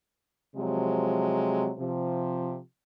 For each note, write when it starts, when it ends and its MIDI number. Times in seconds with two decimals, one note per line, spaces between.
0.56 1.71 48
0.56 1.71 53
0.56 1.71 54
0.56 1.71 56
1.78 2.59 48
1.78 2.59 53